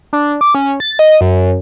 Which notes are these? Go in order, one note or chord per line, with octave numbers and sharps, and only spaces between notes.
D4
D6
C#4
A6
D#5
F#2